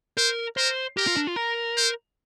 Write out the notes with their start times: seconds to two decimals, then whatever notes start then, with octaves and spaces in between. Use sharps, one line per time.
0.17 A#4 C5
0.57 A#4 C5
0.97 G4 A#4
1.07 F4
1.17 D4
1.27 F4
1.36 A#4
1.77 C5